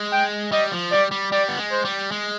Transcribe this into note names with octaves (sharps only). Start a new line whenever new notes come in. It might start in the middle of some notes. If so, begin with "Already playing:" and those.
Already playing: G#3
G5
G3 D#5
F3
G3 D5
G3
G3 D5
B3
G#3
C5
G3
G#3